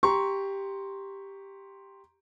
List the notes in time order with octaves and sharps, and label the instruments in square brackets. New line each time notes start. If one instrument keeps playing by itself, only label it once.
[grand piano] G4 A#5 C6 C#6